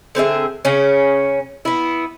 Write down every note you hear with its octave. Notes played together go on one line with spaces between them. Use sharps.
D3 C4 G#4 E5
C#3 C#4
B3 E4